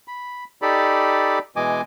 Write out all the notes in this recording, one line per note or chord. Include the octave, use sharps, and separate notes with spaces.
B5
D#4 G4 A4 D5 B5
B2 E3 G#3 D#5 G#5 D6